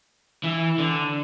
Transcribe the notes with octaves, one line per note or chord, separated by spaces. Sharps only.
E3
D3